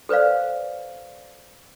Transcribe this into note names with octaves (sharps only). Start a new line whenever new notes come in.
A4 B4 C5 D5 F5